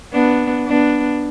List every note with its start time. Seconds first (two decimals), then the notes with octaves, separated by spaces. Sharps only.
0.13 B3 D4
0.67 B3 D4